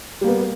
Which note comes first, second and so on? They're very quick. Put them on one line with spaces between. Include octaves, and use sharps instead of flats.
G3 A#3 B3